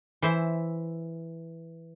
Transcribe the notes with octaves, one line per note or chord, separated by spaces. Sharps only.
E3 C5 E5